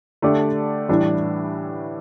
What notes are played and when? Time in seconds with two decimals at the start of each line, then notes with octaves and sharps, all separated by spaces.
0.22 D3 A3 D4 G4 D5
0.89 A2 E3 G3 D4